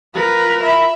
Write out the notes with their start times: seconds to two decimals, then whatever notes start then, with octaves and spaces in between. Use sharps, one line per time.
0.15 F4 A#4 B4
0.63 E5 B5